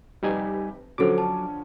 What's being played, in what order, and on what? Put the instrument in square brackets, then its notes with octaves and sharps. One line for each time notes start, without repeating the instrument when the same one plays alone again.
[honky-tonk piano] F1 G4 B4 [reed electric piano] G3 D#4 G#5
[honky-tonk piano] D3 F3 C#4 [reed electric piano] F#3 D6 [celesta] F#4 A4 C5
[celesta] A5